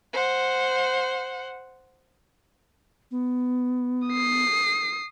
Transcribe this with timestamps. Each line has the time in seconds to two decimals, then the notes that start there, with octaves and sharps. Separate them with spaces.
0.13 C5 F#5
3.11 B3
4.08 D#6 C7